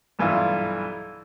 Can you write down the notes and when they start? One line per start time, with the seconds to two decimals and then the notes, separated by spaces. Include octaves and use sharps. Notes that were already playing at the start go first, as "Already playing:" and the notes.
0.19 B1 G2 E3 F4 F5